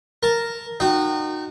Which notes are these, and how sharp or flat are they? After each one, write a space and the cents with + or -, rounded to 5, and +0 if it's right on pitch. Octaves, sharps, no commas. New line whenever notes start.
A#4 +0 A5 +0
D#4 -30 F#4 -15 G5 -20